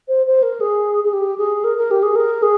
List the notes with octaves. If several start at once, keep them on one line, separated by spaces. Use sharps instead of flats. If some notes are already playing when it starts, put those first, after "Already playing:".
C5
C5
A#4
G#4
G#4
G4
G#4
A#4
A#4
G4
G#4
A#4
G#4